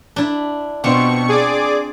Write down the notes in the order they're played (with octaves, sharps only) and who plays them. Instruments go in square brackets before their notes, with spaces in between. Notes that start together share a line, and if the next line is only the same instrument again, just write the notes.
[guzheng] D4 E4
[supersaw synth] B2 C#6 C#7 [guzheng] C4 D4 F4
[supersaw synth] G#4 D5 D6